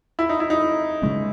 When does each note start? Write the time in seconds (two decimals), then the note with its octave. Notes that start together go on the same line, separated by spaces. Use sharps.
0.19 E4
0.29 D#4
0.40 E4
0.50 D#4
1.02 C#3 G#3 C#4